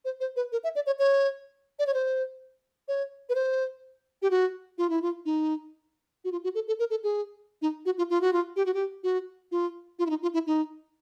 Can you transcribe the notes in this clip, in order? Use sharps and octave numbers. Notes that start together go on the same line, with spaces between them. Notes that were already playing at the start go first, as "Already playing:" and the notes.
C5
C5
B4
A#4
E5
D5
C#5
C#5
D5
C#5
C5
C#5
B4
C5
G4
F#4
F4
E4
F4
D#4
F#4
F4
F#4
A4
A4
A#4
A4
G#4
D#4
F#4
F4
F4
F#4
F4
G4
F#4
G4
F#4
F4
F4
E4
D#4
F4
E4
D#4